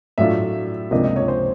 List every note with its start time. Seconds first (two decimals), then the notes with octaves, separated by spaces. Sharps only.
0.18 A2 F#3 A3 D4 F4 E5
0.91 C#2 C3 F3 A#3 D4 D#5
1.04 D#5
1.16 C#5
1.28 C5